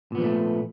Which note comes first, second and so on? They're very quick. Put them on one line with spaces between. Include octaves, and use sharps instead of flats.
A#2 B3 F3 G3 A3